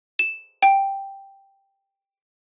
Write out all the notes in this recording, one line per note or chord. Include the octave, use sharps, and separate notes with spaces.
E7
G5